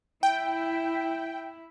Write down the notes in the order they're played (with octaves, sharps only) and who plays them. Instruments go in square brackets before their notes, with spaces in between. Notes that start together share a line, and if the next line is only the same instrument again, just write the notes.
[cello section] E4 [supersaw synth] G5